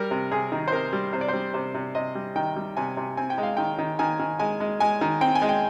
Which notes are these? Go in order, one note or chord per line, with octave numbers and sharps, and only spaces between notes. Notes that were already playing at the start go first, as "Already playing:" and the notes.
Already playing: G3 A#4
C3
C3 G#4
D#3
C5
C3 A#4
G3
C3 C5
D5
G3 C5
C3 C5
C3
C3 D#5
G3
D#3 G5
G3
C3 G#5
C3
C4 G#5
G5
G#3
F5
D#3 G5
D#3
D#3 G#5
D#3
G#3 G#5
G#3
G#3 G#5
D#3
C4 G5
G#5
G#3
G5